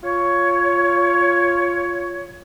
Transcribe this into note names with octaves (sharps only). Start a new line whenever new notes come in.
F4 C#5